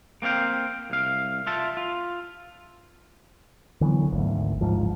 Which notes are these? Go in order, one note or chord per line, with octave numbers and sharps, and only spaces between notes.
A#3 C4 C#5 F5 G5
C2 F5
F4 E5 A5
F4
D3 E3 F#3 B3
G#1 D2
D1 G#1 G#2 F3